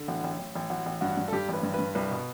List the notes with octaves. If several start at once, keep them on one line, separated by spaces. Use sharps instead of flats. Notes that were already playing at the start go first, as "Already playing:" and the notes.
Already playing: D3
A1 F#4
A1
A1
A1
A1 F#4
A1
G2 F#4
G2
A4
G2 G4
A1 B4
G2
G2 B4
C2 B4
B2